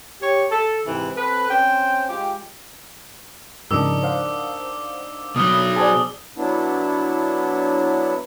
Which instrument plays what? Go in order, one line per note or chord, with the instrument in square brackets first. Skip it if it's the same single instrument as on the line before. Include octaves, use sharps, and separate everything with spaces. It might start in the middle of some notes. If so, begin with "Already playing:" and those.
[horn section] G4 C#5
A4
G#2 C3 E3
C4 A4 B4
C4 C#4 C5 G5
G#3 F4 G4
[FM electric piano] G#2 C#3 F3 [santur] D4 D#4 A#4 [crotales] D6 E6
[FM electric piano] C5 F5 F#5
[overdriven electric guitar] B2 F#3 [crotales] D#6 F6 G7
[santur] G#4 C5 D5 [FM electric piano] G#5 A5
[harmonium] F#3 B3 D4 E4